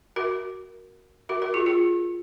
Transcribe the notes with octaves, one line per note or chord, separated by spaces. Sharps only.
F#4 A#4
F#4 A#4
F#4 A#4
F4 G#4
F4 G#4